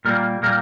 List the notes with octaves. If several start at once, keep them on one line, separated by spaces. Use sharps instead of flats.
A#2 G3 A#3 A#4
A#2 G3 A#3 A#4